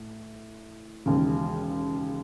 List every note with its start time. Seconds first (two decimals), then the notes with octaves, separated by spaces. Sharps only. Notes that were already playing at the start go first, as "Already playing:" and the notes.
Already playing: A2
1.06 E1 D#2 C#3